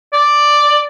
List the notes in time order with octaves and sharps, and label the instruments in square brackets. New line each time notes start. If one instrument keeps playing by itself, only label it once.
[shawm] D5